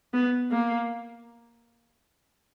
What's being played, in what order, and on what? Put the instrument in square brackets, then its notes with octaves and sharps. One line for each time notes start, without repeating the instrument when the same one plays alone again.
[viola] B3
A#3